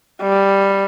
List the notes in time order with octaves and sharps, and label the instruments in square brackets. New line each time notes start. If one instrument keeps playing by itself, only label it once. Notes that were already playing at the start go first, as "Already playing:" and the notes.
[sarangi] G3